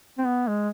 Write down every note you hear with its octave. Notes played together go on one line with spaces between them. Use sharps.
C4
B3
G#3